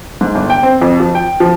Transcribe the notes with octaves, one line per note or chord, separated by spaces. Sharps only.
G#2
G1
G5
C4
F2
F3
G5
F3